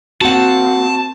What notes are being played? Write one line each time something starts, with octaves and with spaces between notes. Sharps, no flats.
A#3 C4 F#4 F#5 A5